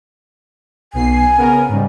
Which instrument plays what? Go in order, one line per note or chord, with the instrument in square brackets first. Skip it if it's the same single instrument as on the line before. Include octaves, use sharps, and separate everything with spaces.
[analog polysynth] B1 B2 C7 [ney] G#5
[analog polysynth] C#3 B3 A#4
G#2 C#3 G3